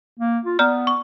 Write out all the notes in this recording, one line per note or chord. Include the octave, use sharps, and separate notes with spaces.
A#3
F4
B3 D5 A#5 F6
C#6